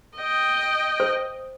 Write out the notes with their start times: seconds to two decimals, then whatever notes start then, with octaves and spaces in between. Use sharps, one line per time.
0.17 D#5 G5
1.00 C5